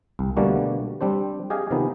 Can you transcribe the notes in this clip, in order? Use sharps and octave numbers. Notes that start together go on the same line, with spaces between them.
C2
B2 D3 G3 A3 A#3 F#4
G3 C4 D4 C5
G4 G#4 D#5 F5 G#5
C3 D#3 F3 B3 D#4